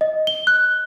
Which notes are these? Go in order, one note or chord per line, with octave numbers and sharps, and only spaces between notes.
D#5
G7
F#6